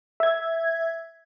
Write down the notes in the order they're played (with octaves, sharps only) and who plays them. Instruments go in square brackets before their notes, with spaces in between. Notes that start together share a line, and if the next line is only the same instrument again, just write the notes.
[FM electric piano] E5 G#6